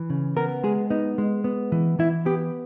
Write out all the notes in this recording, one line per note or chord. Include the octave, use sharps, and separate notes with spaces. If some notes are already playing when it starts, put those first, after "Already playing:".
Already playing: E3
C#3
B3 A#4
G#3 G#4
B3 D#4
G#3
B3
E3
E3 E4
B3 G4